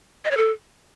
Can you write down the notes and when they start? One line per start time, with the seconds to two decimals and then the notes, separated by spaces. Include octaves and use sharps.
0.25 D#5
0.31 C#5
0.37 A4